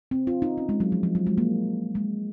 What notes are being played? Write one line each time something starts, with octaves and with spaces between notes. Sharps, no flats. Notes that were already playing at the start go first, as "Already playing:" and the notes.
C4
F4
D#4
C#4
G#3
F#3
F3
F3
F#3
G#3
A#3
G#3